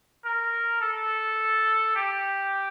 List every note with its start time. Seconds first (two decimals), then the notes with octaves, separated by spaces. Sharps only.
0.25 A#4
0.81 A4
1.96 G4